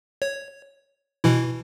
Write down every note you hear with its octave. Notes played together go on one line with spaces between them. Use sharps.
C#5
B2 E3 E4